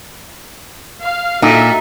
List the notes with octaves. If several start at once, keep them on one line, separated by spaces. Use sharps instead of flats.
F5
A#2 D#4 F#4 A4 E5